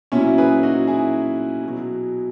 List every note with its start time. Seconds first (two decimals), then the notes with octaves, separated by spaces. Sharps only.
0.12 A#2 F#3 C#4 E4
0.38 G#4 B4
0.63 D#4 F#4
0.87 E4 G#4
1.64 B2 F#3